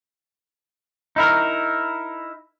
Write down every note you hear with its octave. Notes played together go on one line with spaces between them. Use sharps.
D#4 E4 A#4